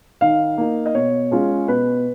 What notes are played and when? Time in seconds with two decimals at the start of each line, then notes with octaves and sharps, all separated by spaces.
0.21 D#3 F5
0.58 A#3 D#4
0.86 D#5
0.94 B2 C#5
1.31 G#3 C#4 F4
1.67 B2 B4